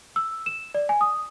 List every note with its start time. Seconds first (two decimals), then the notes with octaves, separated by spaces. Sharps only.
0.16 E6
0.46 E7
0.74 D5
0.89 G#5
1.01 D#6